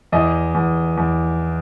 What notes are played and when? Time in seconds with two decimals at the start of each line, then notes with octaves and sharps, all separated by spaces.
0.12 E2 D#5
0.54 E2
0.97 E2